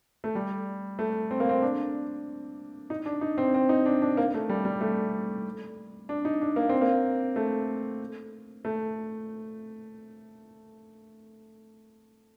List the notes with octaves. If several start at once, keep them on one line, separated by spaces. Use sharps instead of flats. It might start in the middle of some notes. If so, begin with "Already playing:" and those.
A3
G3
A3
C4
A#3
C4
D4
D#4
D4
D#4
C4
C4
D#4
D4
D4
A#3
A3
G3
G3
A3
D4
D#4
D4
A#3
C4
A#3
A3
A3